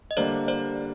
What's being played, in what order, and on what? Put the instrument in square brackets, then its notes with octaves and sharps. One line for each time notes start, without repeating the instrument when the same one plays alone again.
[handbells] D#5
[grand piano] D3 G3 A#3 D4 [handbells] C5 D5
[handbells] C5 D5